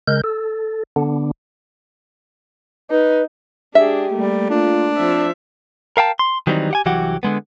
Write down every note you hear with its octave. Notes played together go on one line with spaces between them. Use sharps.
C#3 G#3 A#4 G6
A4
D3 B3 D4
D#4 B4
G#3 D4 G4 G#4 E5
G3 A3 A#3
D4 F4
F3 C4 E5
A#4 F5 G5 A5
C6
D#3 E3 F#3 G3 C4 D#4
G4 F#5 G#5
C2 E3 F#3 F#4 G4 F#5
D3 G#3 B3